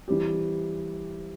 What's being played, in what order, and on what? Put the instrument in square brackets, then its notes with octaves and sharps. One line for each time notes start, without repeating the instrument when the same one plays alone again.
[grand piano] E3 G3 C4 G4